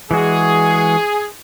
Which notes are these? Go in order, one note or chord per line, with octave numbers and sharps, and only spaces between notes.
E3 G#3 F#4 G#4